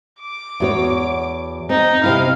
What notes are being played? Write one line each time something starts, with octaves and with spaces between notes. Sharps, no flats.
D6
E2 F#4 C#5
C4 D#4
C3 C4 E4 F5